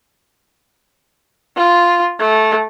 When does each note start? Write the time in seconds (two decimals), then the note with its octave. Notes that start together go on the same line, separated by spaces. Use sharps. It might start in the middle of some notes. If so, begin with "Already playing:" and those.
1.57 F4
2.20 A3